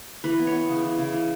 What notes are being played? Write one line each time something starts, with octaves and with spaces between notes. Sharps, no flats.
E3 B4
B3
C#5
B3
C#3
E3
C#3
E3